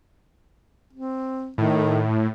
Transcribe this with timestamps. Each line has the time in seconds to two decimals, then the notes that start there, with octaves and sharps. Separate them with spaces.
0.93 C4
1.58 A2 D#3